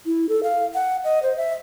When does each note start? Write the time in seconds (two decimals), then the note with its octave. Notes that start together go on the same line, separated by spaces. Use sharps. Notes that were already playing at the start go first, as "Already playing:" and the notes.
0.06 E4
0.29 A4
0.43 F5
0.74 F#5
1.04 D#5
1.23 C5
1.37 E5